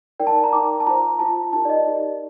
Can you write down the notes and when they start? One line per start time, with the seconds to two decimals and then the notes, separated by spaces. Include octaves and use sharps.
0.20 D#4 A#4 D5 G5
0.27 A5
0.44 A#5
0.52 D#4 A#4 D5 D6
0.80 A5
0.86 F4 C5 A#5
1.19 F4 C5 A5
1.53 D#4 G4 A#4 A5
1.65 D5
1.69 D#5
1.87 D#4 G4 A#4